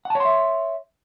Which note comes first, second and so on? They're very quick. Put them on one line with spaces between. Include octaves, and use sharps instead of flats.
F#5 A5 C#5 C6 E5